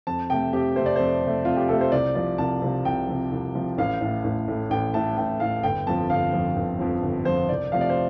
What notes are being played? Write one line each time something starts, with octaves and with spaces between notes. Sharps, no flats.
F2 A5
C3 A3 G5
F2 G4
C3 A3 C5
D5
F2 C5
C3 A3
F2 F4
G4
C3 A3 A4
C5
C2 D5
C3 F3 D5
C2 A5
C3 F3
C2 G5
C3 F3
C2
C3 F3
A1 F5
A2 A3
A1
A2 A3
A1 G5
A2 A3 A5
A1 G5
A2 A3 F5
G1 G5
F2 F3 A5
G1 F5
F2 F3
G1
F2 F3
G1
F2 F3 C5
C2 D5
C3 F3 A3 F5
D5
C5